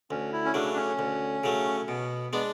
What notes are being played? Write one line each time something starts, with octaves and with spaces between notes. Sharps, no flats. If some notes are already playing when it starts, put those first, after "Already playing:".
D2 C#4
E4
C#4
C#3 F#3 A3 D4
D4
C#4
D2
C#3 F#3 A3
B2 B3
G#3 B3 D4